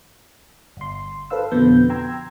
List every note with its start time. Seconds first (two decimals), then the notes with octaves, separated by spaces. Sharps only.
0.77 G1 C6
1.30 A4 B4 C5 F5 E6
1.52 F2 B2 D3 B3 B4 G6
1.90 G5 A#5 C6 E6 G#6